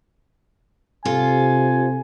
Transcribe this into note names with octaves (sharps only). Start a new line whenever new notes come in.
C3 F4 A4 G#5